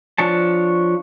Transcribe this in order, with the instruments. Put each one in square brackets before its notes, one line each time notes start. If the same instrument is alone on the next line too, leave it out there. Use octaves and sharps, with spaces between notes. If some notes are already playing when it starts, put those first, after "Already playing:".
[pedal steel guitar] F3 D4 C#5 A5